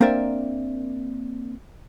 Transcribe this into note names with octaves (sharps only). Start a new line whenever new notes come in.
A#3 C4 D4 A#4 D5 E5